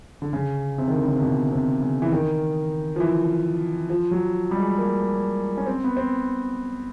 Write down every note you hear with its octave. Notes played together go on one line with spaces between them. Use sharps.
D3
C#3
C3
D#3
D3
C#3
C3
B2
C3
C#3
E3
D#3
F3
E3
F3
F#3
G3
G#3
A#3
C#4
C4
B3
C4